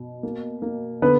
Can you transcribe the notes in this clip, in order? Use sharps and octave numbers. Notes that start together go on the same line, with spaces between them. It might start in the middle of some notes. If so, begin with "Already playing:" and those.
Already playing: B2
A#3
A#3
D3 B3 B4